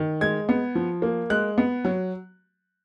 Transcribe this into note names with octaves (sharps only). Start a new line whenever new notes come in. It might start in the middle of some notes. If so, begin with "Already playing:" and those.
Already playing: D#3
G#3 G#6
B3
F3
A#3
G#3 F#6
B3
F#3